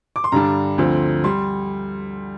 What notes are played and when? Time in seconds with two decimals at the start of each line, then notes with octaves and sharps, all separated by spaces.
0.16 D6
0.24 C6
0.32 G2 D3 G3 D4 A#5
0.78 D2 D3 F3 C4
1.24 G3 C6